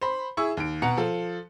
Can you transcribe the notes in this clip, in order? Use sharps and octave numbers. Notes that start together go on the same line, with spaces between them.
C5 B5
E4 G#4 C#6 E6
D#2 D7
B2 F#5 A#5 C#7
F3 A4